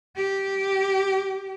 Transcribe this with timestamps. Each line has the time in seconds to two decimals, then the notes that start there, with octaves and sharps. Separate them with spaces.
0.16 G4